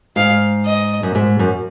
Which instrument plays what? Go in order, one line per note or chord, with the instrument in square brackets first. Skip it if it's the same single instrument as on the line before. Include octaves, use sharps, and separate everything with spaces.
[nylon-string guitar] G#2 [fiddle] F5
[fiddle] D#5
[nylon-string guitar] F#2
G#2
F#2